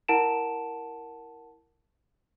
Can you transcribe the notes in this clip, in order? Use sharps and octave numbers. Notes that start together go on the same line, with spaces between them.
E4 A#4 F#5 A5 D7 E7